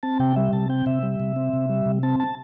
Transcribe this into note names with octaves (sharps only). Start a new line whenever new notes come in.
C4 A5
C3 G5
G3 E5
C3 A5
C4 G5
C3 E5
G3
C3
C4
C3
G3
C3
C4 A5
A5